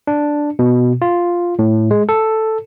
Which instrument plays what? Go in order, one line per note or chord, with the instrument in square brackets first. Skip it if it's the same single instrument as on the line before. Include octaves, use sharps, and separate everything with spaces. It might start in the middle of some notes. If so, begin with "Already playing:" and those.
[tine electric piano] D4
B2
F4
A2
G#3
A4